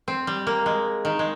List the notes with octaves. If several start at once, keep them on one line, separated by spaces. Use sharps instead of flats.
C4
G3
A#3
G#3
D#3
G#3